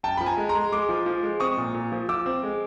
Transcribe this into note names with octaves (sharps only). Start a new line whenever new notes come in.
F#2 G5 A5
F3 B5
G#5 A#5
G#3
A#5 C6
G#3
G#3 C6 D6
F3
F3
G#3
C4 C#6 D#6
A#2
A#2
F3
F3 D6 E6
C4
G#3